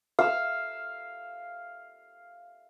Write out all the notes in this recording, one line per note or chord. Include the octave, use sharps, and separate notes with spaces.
F5 E6